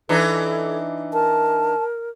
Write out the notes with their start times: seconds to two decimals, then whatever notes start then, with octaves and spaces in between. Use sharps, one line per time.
0.09 E3 D4 D#4 A4
1.13 A#4 A5